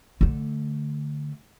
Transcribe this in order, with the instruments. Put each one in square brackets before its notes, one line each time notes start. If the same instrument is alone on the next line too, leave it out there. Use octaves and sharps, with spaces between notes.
[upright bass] D3 A3